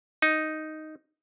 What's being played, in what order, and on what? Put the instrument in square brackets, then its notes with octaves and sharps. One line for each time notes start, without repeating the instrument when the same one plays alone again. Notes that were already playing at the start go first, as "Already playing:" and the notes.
[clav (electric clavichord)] D#4